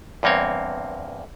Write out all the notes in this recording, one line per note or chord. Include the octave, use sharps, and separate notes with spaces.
E2 G2 A#3 C4 C#5